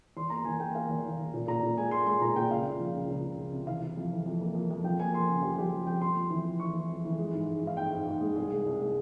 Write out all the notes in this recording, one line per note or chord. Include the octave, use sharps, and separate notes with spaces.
E2 C6
A#3 A#5
E2 G#5
A#3 G5
A#3 F5
E2
E2
E2
A#2
A#2 A#5
A#2
G#3 G#5
G#3 C6
G#3 C6
A#2 A#5
A#2 G5
C#2 F5
C#2
F3
C#2
C#2
C#2
C#2
C3
E3 F5
E3
F2
E3
F2
A#3
F2
F2
F3 G5
A#3 G#5
F2 C6
C#3
F2 G4
F3 G4
F2
F2 G5
F2 C6
F2
E3
F2
E3 C#6
E3
F2
E3
G#3
G#2
G#2
G#2 F5
G#2 G5
G#2
G#2
G#3
C2 G#4
G#3
C2
G#3